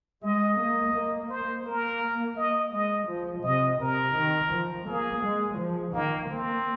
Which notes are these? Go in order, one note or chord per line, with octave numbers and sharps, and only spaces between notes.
G#3 D#5
A#3
A#3
C5
A#3 A#4
D#5
G#3 D#5
F3
C3 D#5
C3 A#4
D#3
F3
A#3 G#4
G#3
F3
D#3 A#3
A#3 C4